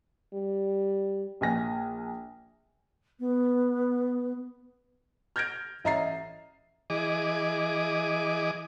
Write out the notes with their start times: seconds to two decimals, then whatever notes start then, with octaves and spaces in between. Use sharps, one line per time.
0.33 G3
1.41 A#1 G#5 A#6
3.20 B3
5.36 F6 G6 G#6 A#6 D7
5.84 A1 D#5 E5 A#5 A6 C7
6.90 E3 G#4 D#5 D6